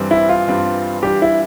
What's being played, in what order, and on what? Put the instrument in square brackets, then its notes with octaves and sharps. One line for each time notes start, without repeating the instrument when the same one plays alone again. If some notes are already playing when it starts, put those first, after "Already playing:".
Already playing: [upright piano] G2 E3 G3 C4
[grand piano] E4
F4
[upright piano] G2 E3 G3 C4
[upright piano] E3 G3 D4 F4 [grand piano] G4
[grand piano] E4